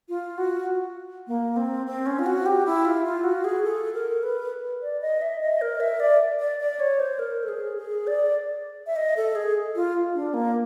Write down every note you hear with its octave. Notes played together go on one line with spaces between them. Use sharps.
F4
F#4
A#3
C4
C4
C#4
F4
F#4
G4
E4
F4
F4
F#4
G#4
A4
A#4
B4
D5
D#5
E5
D#5
A#4
E5
D5
D5
D5
C#5
C5
A#4
A4
G#4
G#4
D5
E5
D#5
A4
G#4
F4
D4
A#3